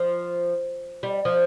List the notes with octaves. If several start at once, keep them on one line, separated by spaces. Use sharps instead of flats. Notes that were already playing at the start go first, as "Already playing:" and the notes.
Already playing: F3
G3
F3